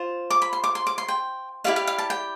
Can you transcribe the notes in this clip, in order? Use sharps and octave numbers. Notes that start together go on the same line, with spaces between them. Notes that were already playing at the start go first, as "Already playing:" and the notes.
Already playing: F4 C5
D6
B5
C6
D6
C6
D6
C6
G5
E4 G4 D5 F5
F5
F5
A5
G5